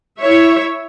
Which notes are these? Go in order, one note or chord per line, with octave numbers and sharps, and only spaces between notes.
E4 C#5 E5